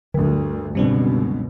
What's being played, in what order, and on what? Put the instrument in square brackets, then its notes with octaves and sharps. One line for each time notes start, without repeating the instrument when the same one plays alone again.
[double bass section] D2 G2 [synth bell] D3
[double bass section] C#2 F#2 B2 [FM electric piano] G3 C4 D4